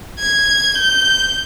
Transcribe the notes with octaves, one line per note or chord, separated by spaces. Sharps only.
G#6
G6